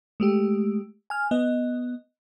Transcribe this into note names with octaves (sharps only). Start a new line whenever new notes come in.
G#3 A3 G4
G#5 F6
B3 D#5